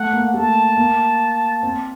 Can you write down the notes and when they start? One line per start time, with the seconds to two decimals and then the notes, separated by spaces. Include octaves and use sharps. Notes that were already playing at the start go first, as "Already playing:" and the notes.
Already playing: A3 F#5
0.13 A#3
0.34 A3 A5
0.77 A#3
1.63 C4